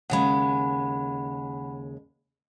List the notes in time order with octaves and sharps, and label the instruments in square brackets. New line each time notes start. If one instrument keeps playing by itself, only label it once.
[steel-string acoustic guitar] D#2 C#3 G#3 [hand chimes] F#5 B5